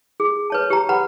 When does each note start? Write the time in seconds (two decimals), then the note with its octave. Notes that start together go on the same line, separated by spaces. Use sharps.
0.20 G#4
0.50 B4 C#5 A5
0.70 G4 A#5
0.89 B4 F#5 A#5 B5